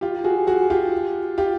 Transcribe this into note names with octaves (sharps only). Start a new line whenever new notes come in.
F4 G4
F#4 G#4
F#4 G#4
F4 G4
F4 G4